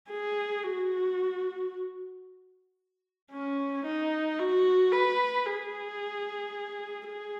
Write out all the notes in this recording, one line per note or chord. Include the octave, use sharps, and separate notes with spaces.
G#4
F#4
C#4
D#4
F#4
B4
G#4
G#4